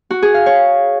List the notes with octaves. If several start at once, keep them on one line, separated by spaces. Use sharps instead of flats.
F#4
G#4
F5
C#5